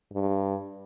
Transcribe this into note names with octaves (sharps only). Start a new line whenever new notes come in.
G2